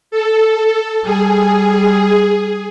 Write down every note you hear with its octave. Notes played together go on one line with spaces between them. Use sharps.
A4
G3 G#4